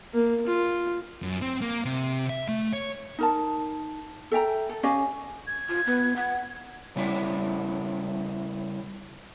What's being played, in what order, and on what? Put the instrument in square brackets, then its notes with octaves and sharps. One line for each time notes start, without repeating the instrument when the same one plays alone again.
[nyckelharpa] A#3
F4
[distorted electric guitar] F#2
C4
A#3
C3
E5
A3
C#5
[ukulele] D#4 A#4 A5
A4 E5 G5 A#5
A4
C#4 G4 D#5 F5
[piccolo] G#6
[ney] F4
B3
F#5
[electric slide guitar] C#3 G3 E4